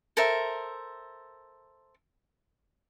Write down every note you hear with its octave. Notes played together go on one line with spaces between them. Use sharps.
A4 A#4 C5 E5